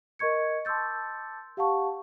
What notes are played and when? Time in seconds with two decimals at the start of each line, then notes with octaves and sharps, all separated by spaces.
0.19 A#4 D#5 C#6 G#6 C#7
0.65 A5 C6 D6 E6 G6 A6
1.57 G4 F5 F#5 A5 C#6